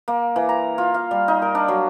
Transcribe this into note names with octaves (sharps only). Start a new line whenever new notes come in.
A#3
E3
A#5
F4
F5
G3
D#4
A#4
D4
F#3